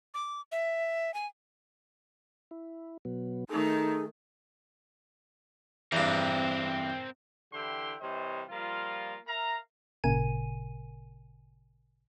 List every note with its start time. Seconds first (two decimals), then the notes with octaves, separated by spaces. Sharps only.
0.14 D6
0.52 E5
1.14 G#5
2.51 E4
3.05 B2 F#3 B3
3.49 D#3 A3 D#4 G#4 A4
5.92 E2 G2 C4 A#4
7.53 D3 E3 E4 G4 G5 C6
8.01 C3 E3 G3 C5 C#5 D#5
8.49 F3 G3 A#3 F4
9.27 A#4 E5 F5 A#5
10.04 G#1 A#2 C#3 A#4 G#5 D#7